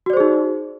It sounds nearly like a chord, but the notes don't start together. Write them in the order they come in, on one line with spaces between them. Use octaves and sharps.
F#4 D5 C5 G#4 D#4